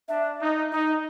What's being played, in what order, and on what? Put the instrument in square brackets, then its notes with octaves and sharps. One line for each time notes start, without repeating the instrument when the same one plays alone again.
[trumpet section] D4 [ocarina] E5
[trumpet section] D#4
[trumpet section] D#4 [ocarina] D#5